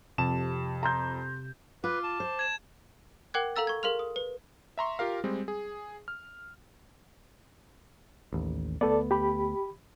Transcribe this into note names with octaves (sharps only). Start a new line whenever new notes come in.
F2 C3 A5 E7
A#5 C6 G6
F4 B4 D6
A5
C5
G#6 E7
A#4 F#5 G5 D6 F#6 G#6
A4 F5 A#5 E6 A6
C#6 G#6
G#4 A#4 F5 C6 F6 F7
D#6
B4
E5 A#5 C6 C#6
F4 G4 A#4 F5
G3 G#3 C4
G#4
F6
A1 D#2
D2 A3 B3 A4 D5
G4 B5